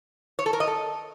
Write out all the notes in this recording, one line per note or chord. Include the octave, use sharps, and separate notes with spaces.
C#5
A4
A#4
D#5
A4